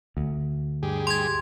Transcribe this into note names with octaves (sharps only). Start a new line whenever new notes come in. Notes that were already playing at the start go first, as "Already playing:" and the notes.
D2
G2 G4 G#4
C6 G#6